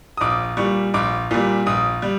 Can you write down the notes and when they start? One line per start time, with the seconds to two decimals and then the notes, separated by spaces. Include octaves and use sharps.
0.17 D#6
0.21 A#1 D6
0.57 A#2 G3 C#6
0.94 A#1 D6
1.31 A#2 G3
1.66 A#1 D#6
2.02 G3